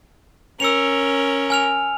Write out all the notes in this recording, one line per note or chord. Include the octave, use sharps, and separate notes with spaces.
C#4 A#4 E6 C#7 F7
G#5 F6 F7